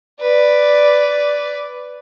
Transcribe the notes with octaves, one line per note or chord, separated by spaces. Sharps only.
B4 D5